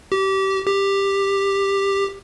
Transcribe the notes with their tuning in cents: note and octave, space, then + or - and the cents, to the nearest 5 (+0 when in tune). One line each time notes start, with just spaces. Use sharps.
G4 -25
G4 +10